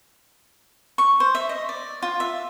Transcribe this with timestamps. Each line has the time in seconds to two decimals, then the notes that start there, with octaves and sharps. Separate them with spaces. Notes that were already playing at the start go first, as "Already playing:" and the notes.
0.98 C#6
1.20 C5
1.35 E5
1.49 D#5
1.69 D5
2.02 F4
2.20 E5